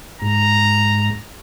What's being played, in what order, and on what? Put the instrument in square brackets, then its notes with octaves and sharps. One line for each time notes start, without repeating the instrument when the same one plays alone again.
[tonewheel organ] G#2 [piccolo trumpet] A#5